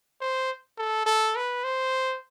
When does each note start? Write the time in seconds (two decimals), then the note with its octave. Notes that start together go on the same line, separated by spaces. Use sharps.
0.21 C5
0.78 A4
1.06 A4
1.36 B4
1.64 C5